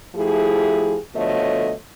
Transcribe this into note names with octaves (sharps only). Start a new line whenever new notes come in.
F3 A3 E4 G4 G#4
B2 D3 F3 A3 C#5 D#5